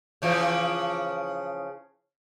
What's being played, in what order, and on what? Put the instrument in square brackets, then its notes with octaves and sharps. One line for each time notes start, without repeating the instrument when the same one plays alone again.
[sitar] C#3 E3 F3